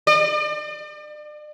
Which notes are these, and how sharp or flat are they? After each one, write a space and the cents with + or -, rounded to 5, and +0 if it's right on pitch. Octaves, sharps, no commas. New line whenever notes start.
D5 +40